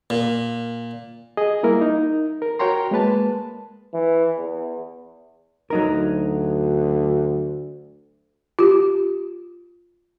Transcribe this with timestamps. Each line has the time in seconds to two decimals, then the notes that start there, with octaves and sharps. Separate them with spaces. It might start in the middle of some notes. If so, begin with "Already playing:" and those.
0.10 A#2
1.37 G#4 D#5
1.63 G3 A#3 E4 A#4
1.81 D#4
2.42 A#4
2.59 F#4 A#4 C#5 G5 A#5 C6
2.91 G#3 A#3 B4 A5
3.94 E3
4.37 E2
5.70 D2 F#3 D#4 A#4
8.59 F4 G4